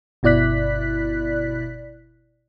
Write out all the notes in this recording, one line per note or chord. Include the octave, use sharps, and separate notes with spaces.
G1 B2 E4 D5 F#6 B6